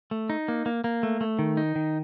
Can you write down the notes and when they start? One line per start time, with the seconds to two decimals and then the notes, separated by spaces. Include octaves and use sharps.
0.11 A3
0.30 D#4
0.48 A#3
0.66 A#3
0.84 A#3
1.03 A3
1.21 A3
1.39 D#3
1.57 D#4
1.76 D#3